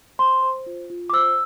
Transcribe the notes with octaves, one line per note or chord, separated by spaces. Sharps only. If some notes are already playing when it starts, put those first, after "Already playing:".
C5 C6
C5
F4
F4
D6
C5 E6